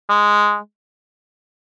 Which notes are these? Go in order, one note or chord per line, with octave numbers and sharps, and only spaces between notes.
G#3